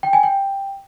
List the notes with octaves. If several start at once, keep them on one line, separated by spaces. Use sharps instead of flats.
G5
G#5
G5